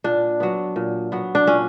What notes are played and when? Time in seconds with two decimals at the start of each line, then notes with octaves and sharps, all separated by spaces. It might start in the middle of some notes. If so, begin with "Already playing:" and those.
0.04 A#2 D4
0.40 F#3 B3
0.76 A#2
1.12 F#3 B3
1.35 D4
1.47 A#2 C#4